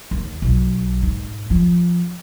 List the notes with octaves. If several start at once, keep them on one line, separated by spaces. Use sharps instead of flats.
D#2
B1
G#2
F3